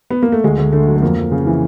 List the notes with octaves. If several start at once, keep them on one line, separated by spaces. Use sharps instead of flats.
B3
A#3
A3
D2 G#3
D2 A3
D3 A3
F#3
A3
F2 A#3
F2
C#3
E3